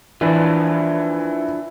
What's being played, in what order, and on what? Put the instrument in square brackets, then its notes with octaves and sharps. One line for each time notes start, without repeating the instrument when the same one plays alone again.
[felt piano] E3 [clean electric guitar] F3 D4 E4